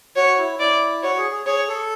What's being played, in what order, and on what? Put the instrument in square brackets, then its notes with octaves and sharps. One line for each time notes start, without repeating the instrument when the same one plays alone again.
[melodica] F#4 [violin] C#5
[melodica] E4
[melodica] E4 [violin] D5
[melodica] F#4 [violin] C#5
[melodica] G#4
G#4
[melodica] G#4 [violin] C#5
[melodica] A4